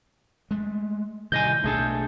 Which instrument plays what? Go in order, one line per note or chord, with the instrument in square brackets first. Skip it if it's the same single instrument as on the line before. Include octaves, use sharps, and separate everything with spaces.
[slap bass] G#3 A3
[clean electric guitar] C2 D#5 G#5 [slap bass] A2 D#3 [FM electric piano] G6
[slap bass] B1 A2 D4 [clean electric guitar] A3 G#4 A4